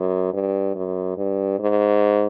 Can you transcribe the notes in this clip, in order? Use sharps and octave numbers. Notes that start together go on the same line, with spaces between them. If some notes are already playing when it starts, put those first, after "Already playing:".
Already playing: F#2
G2
F#2
G2
G#2